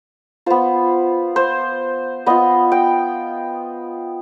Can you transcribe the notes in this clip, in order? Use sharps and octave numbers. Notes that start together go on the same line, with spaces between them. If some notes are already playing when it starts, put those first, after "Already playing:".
B3 F4 C5
C5
B3 F4 D#5
G5